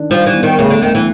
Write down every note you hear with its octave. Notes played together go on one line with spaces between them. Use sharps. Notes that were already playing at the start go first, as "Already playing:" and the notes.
Already playing: D#3 D4
F3 G3
E3
B3
D#3
D2 C#3
D3
D2 D#3
E3